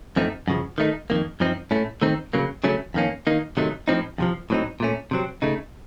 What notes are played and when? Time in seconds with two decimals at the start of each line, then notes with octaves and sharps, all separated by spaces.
0.16 F#2 F3 A3 C4 D#4
0.48 F#2 C#3 F3
0.78 D#3 A3 C4 D#4
1.10 F2 D#3 A#3
1.40 F#2 F3 C4 D#4
1.71 A2 A3 C#4
2.02 D#3 A3 C4 D#4
2.33 C#3 F#3 A#3
2.64 C#3 F#3 A3 C#4
2.94 F2 D#3 A#3 C#4
3.27 D#3 A#3 D#4
3.57 C3 D#3 F#3 A3 D#4
3.88 A2 F3 C4 D#4
4.18 F2 C3 F3
4.50 A2 F#3 C4 D#4
4.80 A#2 A3 C#4
5.11 C3 F#3 C4
5.42 C#3 A3 D#4